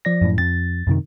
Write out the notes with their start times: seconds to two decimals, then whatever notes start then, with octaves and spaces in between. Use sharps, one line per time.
0.05 F3 D5 A#6
0.22 F#2 A2
0.38 F2 A6
0.87 F#2 C3 D#3